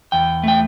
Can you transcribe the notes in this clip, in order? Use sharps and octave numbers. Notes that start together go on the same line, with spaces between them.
E2 G5
A3 G5